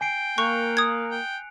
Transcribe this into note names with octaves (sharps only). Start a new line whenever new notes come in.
G5 G#5 C7 D7
A#3 C#6 F#6 C#7 F7
D#6 G#6
G5